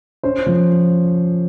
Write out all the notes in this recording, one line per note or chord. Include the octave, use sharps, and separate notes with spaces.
C#4 C5
F3